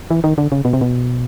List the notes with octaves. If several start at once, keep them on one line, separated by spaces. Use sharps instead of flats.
E3
D#3
D3
C#3
B2
C3
B2